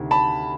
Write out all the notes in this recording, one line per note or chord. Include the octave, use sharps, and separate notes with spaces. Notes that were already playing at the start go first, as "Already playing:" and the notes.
Already playing: D2 C3 D#3
A5 B5